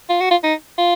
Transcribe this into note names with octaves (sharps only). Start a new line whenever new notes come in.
F4
F#4
F4
D#4
F4